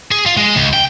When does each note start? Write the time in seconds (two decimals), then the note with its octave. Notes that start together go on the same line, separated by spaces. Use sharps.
0.12 G#4
0.26 F4
0.37 G#3
0.56 C#2
0.74 G5